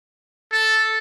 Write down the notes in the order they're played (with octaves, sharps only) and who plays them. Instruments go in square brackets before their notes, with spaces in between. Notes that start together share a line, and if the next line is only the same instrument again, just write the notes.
[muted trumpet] A4